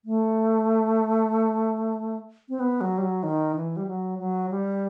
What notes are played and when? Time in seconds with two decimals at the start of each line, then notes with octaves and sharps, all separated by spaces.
0.05 A3
2.49 C4
2.60 B3
2.81 F#3
2.98 G3
3.02 F#3
3.23 D#3
3.56 E3
3.77 G3
3.87 F#3
4.19 F#3
4.50 G3